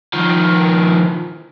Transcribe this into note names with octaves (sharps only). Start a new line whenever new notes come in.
D#3 F3